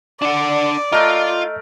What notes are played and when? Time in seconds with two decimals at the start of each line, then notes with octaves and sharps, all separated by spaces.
0.22 D4 D5 F#5
0.92 A3 F4 A#4 D#5